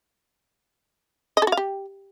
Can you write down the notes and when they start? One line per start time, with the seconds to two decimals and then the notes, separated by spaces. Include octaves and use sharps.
1.37 D#5
1.42 A4
1.47 F#4
1.52 F5
1.57 G4